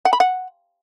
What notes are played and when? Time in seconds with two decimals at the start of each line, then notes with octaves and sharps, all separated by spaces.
0.05 F#5
0.13 B5
0.20 F#5